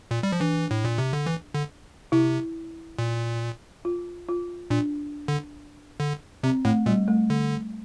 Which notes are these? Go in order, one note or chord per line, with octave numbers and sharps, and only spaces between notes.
A#2
G3
F3
E3 D4
A2
A#2
C3
D3
E3
D3
C3 E4
A#2
F4
F4
A#2 D4
D3
D3
C3 C4
A2 A3
A#2 G3
A3
D3